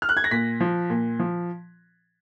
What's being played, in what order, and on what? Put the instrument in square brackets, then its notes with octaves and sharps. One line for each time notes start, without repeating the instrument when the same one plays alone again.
[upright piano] F6
F#6
G#6
A#6
A#2 B6
F3
A#2
F3